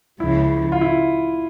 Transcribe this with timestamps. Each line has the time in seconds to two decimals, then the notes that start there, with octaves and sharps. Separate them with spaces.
0.20 C#2 C#3 F3 E4
0.72 F4
0.81 E4